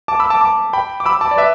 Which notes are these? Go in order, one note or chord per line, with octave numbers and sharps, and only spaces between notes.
A5 D6
B5 E6
A5 D6
A5 D6
G5 B5
D6
B5 E6
A5 D6
D5
B4 E5